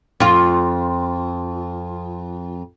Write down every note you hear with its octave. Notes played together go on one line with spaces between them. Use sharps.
F2 F4